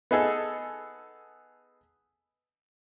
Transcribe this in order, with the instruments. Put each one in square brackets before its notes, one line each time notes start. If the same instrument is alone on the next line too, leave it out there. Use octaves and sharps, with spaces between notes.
[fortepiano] B3 D#4 G#4 A4